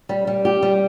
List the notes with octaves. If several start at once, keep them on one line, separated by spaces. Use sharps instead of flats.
G3
G3
G4
G3